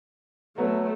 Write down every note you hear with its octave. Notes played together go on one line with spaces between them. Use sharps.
F#3 A3 B3